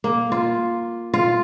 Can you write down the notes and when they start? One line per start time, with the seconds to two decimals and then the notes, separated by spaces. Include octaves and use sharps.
0.04 A#3
0.32 F4
1.14 F4